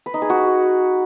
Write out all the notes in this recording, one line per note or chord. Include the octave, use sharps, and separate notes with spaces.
B4
D#4
G#4
F#4